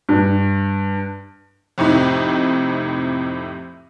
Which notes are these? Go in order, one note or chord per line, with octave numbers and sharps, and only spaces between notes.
G2
F2 A2 C3 D#4